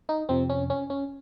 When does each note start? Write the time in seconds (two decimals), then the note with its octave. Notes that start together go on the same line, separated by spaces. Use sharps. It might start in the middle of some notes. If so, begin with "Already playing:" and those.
0.09 D#4
0.29 F2 C3 F3 C4
0.50 C#4
0.70 C#4
0.90 C#4